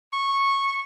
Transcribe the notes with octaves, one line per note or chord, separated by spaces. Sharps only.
C#6